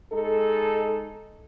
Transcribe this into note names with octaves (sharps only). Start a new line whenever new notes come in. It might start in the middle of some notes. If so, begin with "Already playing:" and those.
G#3 D#4 A4